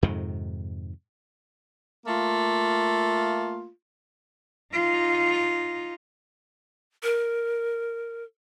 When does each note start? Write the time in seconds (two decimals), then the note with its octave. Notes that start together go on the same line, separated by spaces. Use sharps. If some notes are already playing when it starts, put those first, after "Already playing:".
0.03 F2 G#2 C3 D#3
2.05 A3 A#3 F4
4.73 D#4 F4
7.03 A#4